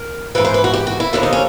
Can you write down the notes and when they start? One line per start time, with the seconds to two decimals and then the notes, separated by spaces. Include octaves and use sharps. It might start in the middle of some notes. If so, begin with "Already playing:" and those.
Already playing: A#4
0.35 G#2 E3 B4
0.45 C5
0.54 B4
0.64 F#4
0.74 G4
0.87 F#4
1.00 E4
1.13 D#2 D3 F3 E4
1.23 D#4
1.33 C#4